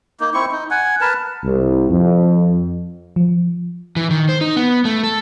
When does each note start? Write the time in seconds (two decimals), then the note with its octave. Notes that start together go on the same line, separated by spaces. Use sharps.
0.20 A#3 D#4
0.34 C4 E4 C#6
0.51 D#4
0.71 F#5 G#5
1.01 A#4 B4 A5
1.44 C2
1.90 F2
3.16 F3
3.96 E3
4.11 D#3
4.29 C5
4.41 D#4
4.56 B3
4.85 A3
5.03 A4